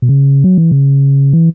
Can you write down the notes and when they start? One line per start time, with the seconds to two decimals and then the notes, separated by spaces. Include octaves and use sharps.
0.02 B2
0.09 C#3
0.44 F#3
0.58 E3
0.71 C#3
1.33 E3